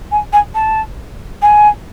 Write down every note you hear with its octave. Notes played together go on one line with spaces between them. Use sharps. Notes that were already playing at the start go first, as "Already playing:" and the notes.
G#5
G#5
A5
G#5